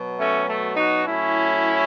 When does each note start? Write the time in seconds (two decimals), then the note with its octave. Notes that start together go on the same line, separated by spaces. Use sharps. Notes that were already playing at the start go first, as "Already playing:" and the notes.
Already playing: B2 F#3
0.20 A3 C#4
0.48 A3
0.77 D#4 F#4
1.05 A2 F#3 C#4 E4